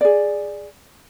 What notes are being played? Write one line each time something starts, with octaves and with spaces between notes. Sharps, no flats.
G#4 D5